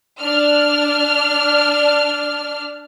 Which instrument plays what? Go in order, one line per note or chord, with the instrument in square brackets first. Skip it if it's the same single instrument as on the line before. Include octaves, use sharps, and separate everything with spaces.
[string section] D4 F6